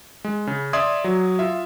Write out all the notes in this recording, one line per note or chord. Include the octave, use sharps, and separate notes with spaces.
G#3
C#3
D5 E5 C6 D#6 G#6
F#3
F4 E5